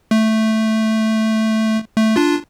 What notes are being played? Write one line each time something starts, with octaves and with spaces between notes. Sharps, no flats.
A3
A3
D4 F4